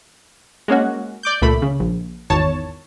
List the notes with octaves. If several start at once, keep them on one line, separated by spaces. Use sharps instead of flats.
G#3 A#3 C#4 F#4
D5 D6 G6
C#2 A#2 A3 B5
C#3
A#1
G#1 E2 D#3 C#5 A5